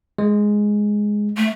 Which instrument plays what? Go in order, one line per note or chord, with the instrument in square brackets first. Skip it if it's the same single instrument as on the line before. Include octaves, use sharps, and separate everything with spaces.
[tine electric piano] G#3
[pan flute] A3